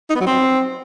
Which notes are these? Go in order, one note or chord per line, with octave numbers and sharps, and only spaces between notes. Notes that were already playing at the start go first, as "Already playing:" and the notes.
D#4
B3
F#3
C4